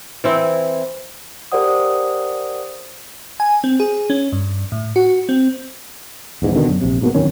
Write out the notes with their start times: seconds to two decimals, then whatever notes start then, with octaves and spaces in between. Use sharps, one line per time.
0.24 E3 C4 E4
1.52 G4 A#4 C5 D5 F#5 D#6
3.40 G#5
3.64 C4
3.80 G#4
4.10 C#4
4.32 G2
4.72 A2
4.96 F#4
5.29 C4
6.42 D#1 E2 G#2
6.56 B2 D3 D#3
6.68 F#2
6.81 A#1 C3
7.01 G#2 B2 A#3
7.15 D1 F2 D#3 C#4